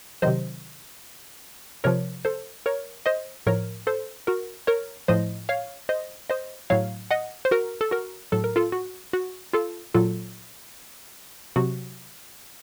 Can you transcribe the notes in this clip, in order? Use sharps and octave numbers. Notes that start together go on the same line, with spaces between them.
C3 D#3 F#3 C5 D#5
C3 F3 A#4 C#5
A4 C5
A#4 C#5
C5 D#5
A2 F3 A#4 C#5
A4 C5
F#4 A#4
A#4 C#5
A2 F3 C5 D#5
C#5 F5
C5 D#5
C5 D#5
A2 F#3 C#5 F5
D#5 F#5
C5
F#4 A#4
A4
F#4 A#4
A2 F#3 A4
A#4
F4 A4
F#4
F#4
F4 A4
A#2 F#3 F4 A4
C3 F#3 F#4